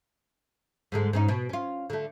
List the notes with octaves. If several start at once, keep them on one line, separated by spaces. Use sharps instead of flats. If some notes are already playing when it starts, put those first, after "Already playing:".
G#2 D3 G#3
G#2 C#4 D#4
B2
C#4 F4
D3 A3